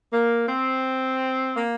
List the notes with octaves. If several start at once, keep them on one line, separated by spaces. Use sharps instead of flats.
A#3
C4
A#3